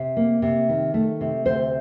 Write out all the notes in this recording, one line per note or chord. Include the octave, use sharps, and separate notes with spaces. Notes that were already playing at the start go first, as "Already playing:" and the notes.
Already playing: C3
A#3
C3
D#3
A3
C3
D2 C5